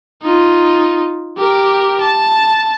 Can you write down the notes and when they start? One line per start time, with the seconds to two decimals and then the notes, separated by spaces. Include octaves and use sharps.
0.22 D#4 F4
1.38 G4 A#4
2.00 A5